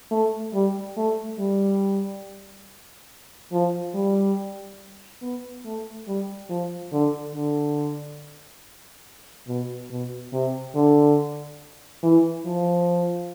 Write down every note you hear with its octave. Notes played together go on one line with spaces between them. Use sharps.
A3
G3
A3
G3
F3
G3
B3
A3
G3
F3
D3
D3
B2
B2
C3
D3
E3
F3